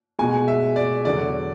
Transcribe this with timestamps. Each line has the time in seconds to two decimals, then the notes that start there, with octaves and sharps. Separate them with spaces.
0.19 B2 G#3 G#5
0.48 E5
0.76 D5
1.05 E2 D3 F#3 D5